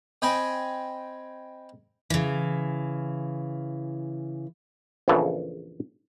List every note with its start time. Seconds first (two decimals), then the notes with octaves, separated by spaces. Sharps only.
0.22 C4 D#5 G5 G#5 B5
2.10 C#3 E3
5.08 A#1 E2 C#3 E3 A4